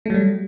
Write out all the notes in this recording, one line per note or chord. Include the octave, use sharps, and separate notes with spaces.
F#3 G3 A3